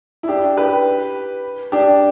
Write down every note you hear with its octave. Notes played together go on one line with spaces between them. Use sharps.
E4
D4 G4
G4 B4
D4 G4